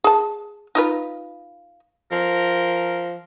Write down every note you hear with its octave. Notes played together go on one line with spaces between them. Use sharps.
G#4 A5
D#4 F4 B4
F3 A#4